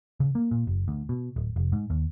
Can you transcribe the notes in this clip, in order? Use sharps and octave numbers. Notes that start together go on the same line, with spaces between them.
C#3
A#3
A#2
F#1
D2
B2
D1
F1
G#2
D#2